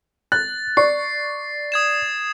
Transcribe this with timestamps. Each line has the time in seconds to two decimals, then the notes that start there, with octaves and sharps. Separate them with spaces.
0.32 F#6 A6
0.77 D5 C#6 C7
1.72 D#6 G#6 E7